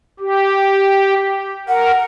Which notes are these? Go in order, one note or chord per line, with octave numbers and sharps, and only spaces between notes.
G4
A#4 F#5